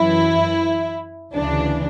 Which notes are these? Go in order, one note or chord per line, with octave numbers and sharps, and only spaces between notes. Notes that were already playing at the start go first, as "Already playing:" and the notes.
Already playing: F#2 E3 E4
D2 C#3 E3 D4